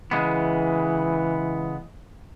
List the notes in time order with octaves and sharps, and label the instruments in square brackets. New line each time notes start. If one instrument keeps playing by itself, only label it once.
[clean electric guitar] C#3 G#3 B3 [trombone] E3